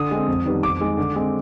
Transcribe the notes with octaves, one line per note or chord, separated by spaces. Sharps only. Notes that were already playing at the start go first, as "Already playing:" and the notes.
Already playing: D3 D#6
G#3 C4
F2
D#3 G3 B3
F2 D6
D#3 G#3
D3
G#3 C4